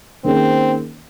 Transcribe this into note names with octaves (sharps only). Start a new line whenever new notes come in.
D#3 A#3 C4 C#4 G#4 C5